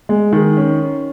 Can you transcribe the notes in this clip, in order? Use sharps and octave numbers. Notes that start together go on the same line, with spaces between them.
G#3
D#3
C#4